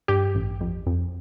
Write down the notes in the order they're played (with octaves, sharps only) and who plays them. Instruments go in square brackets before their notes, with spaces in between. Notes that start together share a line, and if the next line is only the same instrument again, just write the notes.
[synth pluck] G2 G4
A1
F2
F2